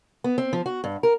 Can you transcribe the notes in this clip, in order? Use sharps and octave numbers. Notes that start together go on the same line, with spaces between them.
B3
C4
F3
F#4
G2
A#4